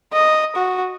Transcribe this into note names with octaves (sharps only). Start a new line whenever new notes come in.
D#5
F#4